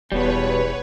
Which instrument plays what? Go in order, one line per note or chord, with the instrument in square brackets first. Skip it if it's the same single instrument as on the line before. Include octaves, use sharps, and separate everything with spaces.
[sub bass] E1 [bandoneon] E2 [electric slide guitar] B2 G3 [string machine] B4 C#5